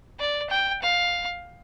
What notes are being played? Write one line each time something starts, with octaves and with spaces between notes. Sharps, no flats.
D5
G5
F5